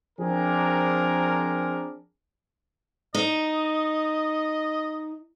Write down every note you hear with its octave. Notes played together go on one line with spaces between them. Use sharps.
F3 C4 D4 G#4 A#4
D#4 D#5